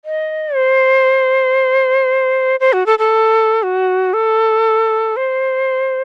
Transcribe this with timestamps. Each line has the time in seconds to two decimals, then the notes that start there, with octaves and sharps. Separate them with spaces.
0.05 D#5
0.55 C5
2.60 C5
2.73 F#4
2.86 A4
2.99 A4
3.63 F#4
4.14 A4
5.17 C5